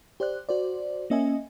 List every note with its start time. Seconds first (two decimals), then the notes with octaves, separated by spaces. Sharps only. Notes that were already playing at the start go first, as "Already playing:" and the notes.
0.20 G4 C5 D5 F#6
0.49 F#4 C5 D5
1.10 A#3 C#4 D#5 E5 G#5